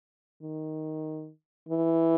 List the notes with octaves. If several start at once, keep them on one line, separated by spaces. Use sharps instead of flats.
D#3
E3